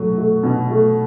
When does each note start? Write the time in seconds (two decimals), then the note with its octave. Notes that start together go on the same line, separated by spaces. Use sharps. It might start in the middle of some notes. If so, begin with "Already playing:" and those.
Already playing: B2 F#3 A3
0.18 A3
0.43 B2
0.70 A3